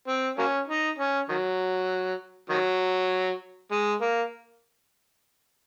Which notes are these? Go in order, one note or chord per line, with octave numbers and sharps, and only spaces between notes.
C4
F#3 A#3 C#4
D#4
C#4
D#3 F#3
D#3 F#3
G#3
A#3